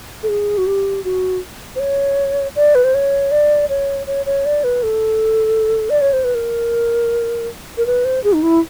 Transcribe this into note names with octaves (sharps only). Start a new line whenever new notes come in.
A4
G#4
F#4
G4
F#4
C5
C#5
D5
B4
C5
C#5
D5
C#5
C#5
C#5
D5
B4
A4
D5
C#5
C5
B4
A#4
A#4
B4
C5
G#4
D#4
E4